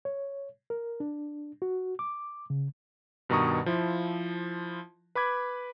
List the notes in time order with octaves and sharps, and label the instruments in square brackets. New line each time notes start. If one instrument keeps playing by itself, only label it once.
[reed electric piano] C#5
A#4
D4
F#4
D6
C#3
[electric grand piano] G2 B2 D#3 A#5 C#6 D#6
F3 E4
B4 B5 D6 G#6